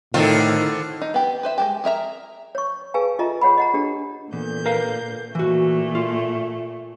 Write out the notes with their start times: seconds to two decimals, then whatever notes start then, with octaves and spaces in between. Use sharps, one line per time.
0.14 A2 D3 D#3 C4 F4
1.01 D#4
1.14 B3 G4
1.43 B4 C5 E5
1.58 G#3 A3 G4
1.84 G#4 A#4 E5 A#5
2.55 C#5 C#6
2.94 G#4 B4 F5 G#5 A5
3.19 F4 A4 D#5 E5 A#5
3.41 G#4 C#5 F#5 B5
3.58 D#5 F#5 A#5
3.74 D4 G4 A4
4.33 E2 A#2 D3 G6
4.66 A#4 B4 F5
5.35 A#2 E3 A3 F#4
5.95 F4